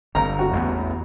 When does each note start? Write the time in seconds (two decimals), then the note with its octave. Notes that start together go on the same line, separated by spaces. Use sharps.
0.15 G1 G2 A#5
0.39 F#4
0.53 A1 E2 B3